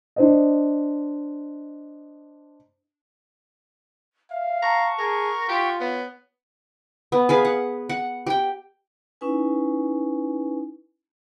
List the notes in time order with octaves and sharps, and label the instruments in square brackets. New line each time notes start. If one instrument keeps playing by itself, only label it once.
[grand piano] D4 C5 D#5
[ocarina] E5 [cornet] F5
[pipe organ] F#5 C#6 [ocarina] A5 [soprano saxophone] A#5
[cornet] G#4 [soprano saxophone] A#4
[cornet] F4 [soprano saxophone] G4 [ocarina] C6
[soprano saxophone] B3 [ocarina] C#5
[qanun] B3
G#4 B4 F5
F#5
F#5
G4 G5
[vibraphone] C#4 D#4 E4 B4 G#5